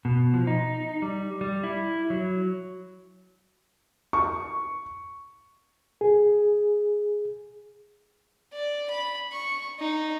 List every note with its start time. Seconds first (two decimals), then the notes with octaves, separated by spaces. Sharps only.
0.05 B2
0.34 F3
0.47 D#4
1.02 G3
1.41 G3
1.64 E4
2.10 F#3
4.13 C#6
6.01 G#4
8.53 D5
8.90 B5
9.32 C#6
9.79 D#4